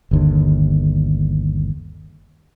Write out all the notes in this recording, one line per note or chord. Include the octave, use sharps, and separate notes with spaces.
G1 D#2 D3